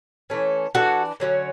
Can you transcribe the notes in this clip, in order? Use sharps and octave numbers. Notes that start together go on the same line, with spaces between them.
E3 A3 C#4
E3 B3 D4 F#4 A4
D3 F#3 A3 C#4